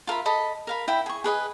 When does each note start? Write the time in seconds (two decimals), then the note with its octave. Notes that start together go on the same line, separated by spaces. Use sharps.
0.07 F4 A#4 E5 B5
0.26 A4 D#5 B5
0.67 A#4 F5 B5
0.88 E4 E5 G5 B5
1.06 G#4 C#6
1.24 G#4 B4 D#5 G#5